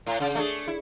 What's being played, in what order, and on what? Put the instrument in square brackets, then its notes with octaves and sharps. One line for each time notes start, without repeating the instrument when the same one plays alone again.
[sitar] A2
C#3
A3 D4 G#4
E4